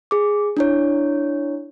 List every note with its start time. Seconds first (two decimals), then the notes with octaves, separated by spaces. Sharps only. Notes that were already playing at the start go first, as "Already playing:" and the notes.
0.11 G#4 D6
0.57 D4 E4 C#5